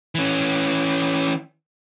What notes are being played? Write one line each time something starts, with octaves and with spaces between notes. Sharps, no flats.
E3 C#4